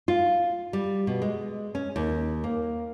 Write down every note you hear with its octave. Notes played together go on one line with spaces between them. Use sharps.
F4
G3
B2
G#3
C#4
D#2
A#3